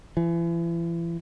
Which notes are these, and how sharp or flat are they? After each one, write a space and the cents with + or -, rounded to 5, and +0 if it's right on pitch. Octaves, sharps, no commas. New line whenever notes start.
E3 +35